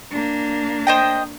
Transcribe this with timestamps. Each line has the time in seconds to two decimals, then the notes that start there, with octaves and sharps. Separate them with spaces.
0.11 A#3 D4
0.87 C5 D#5 G5